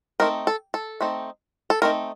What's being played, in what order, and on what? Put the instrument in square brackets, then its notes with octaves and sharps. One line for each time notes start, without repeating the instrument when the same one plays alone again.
[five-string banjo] A3 C4 D#4 A#4
A4
A4
A3 C4 D#4
A4
A3 C4 D#4 A#4